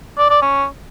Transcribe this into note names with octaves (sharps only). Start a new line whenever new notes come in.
D5
D5
C#4